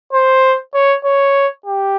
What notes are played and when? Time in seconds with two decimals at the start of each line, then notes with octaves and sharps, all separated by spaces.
0.13 C5
0.74 C#5
1.05 C#5
1.66 G4